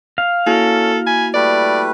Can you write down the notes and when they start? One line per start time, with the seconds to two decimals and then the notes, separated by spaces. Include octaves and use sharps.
0.18 F5
0.46 A#3 C#4 E4 F#4 A4
1.06 G#5 B5
1.34 G3 A3 B4 D5